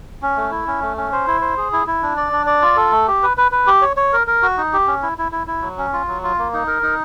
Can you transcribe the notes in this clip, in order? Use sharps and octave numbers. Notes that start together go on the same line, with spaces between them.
C#4
A3
E4
C#4
A3
C#4
C5
E4
C5
G#4
E4
E4
D4
D5
D4
D5
F4
A4
A3
G4
B4
B4
B4
G4
C#5
C#5
A#4
A#4
F#4
D#4
G4
C#4
E4
E4
E4
E4
F#3
C#4
F4
F#3
F4
A#3
D#4
A#4
D#4